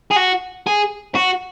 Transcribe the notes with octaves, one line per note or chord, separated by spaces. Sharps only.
G#4
F#4
G#4
F#4